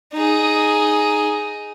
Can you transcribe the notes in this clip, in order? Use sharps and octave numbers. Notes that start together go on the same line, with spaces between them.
D#4 G#4